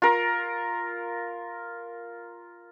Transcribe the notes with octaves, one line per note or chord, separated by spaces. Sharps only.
F4 A#4